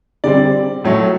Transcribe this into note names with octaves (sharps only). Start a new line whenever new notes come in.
D3 G3 C4 D5
A2 F#3 A3